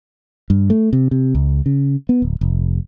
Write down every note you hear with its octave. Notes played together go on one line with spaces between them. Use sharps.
G2
A3
C3
C3
C#2
C#3
B3
D1
F1